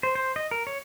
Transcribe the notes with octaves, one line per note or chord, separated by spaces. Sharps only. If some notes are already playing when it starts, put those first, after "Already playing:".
C5
C5
D#5
A#4
C#5